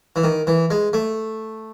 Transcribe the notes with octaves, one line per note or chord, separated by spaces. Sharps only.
E3
D#3
E3
G#3
A3